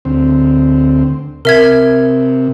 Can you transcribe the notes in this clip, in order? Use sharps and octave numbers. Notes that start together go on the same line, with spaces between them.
D2 C4
C3 A#4 E5 G#6